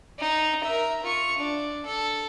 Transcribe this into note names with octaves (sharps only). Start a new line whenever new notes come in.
D#4
A#4 E5
F4 C#6
D4
A4